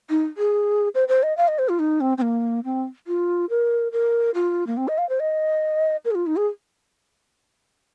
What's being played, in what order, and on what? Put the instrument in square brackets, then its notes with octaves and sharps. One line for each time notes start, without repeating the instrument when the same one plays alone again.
[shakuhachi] D#4
G#4
C5
C5
D#5
F5
D#5
C5
F4
D#4
C4
C4
A#3
C4
F4
A#4
A#4
F4
A#3
C4
D#5
F5
C5
D#5
A#4
G#4
F4
D#4
G#4